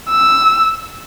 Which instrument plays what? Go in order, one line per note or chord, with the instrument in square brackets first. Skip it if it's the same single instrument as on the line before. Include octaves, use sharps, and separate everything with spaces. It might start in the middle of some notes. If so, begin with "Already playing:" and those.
[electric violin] E6